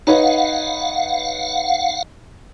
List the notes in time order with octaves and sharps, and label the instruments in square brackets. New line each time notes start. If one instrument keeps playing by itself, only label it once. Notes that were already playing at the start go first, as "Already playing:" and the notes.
[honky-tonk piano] D#4 B4 C#5 [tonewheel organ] F5 F#5